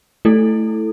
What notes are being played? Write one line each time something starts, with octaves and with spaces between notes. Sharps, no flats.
A3 E4 A4